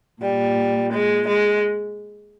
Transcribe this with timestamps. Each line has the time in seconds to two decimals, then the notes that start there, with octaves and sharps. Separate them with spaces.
0.22 A#2 G3
0.92 G#3
1.27 G#3